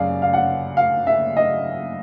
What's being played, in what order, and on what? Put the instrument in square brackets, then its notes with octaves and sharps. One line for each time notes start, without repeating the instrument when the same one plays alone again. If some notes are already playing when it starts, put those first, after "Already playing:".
Already playing: [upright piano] F#2 C#3 D5 F5
F5
F#5
F5
E5
D#5